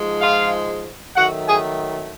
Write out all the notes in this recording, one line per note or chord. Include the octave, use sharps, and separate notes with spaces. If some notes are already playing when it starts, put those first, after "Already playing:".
Already playing: G#2 F3 G#3
F4 F5
D#3 F#3 A3 F#4 F#5
G#4 G#5